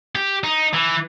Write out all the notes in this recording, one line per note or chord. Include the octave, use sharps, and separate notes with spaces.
G4
D#4
E3